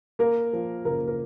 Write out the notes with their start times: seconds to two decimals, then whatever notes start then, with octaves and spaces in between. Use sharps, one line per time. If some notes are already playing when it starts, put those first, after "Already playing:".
0.19 A#3 A#4
0.53 F3
0.85 F#1 A#4
1.08 A#4